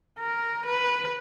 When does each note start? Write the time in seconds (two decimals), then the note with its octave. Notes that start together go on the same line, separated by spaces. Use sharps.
0.19 A#4
0.66 B4